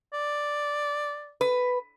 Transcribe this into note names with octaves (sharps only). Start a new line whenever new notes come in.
D5
B4